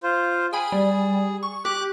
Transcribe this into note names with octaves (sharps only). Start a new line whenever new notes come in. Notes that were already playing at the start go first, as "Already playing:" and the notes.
F4 C5
G#4 G5 G#5 B5
G3
C#6
G4 D6 F#6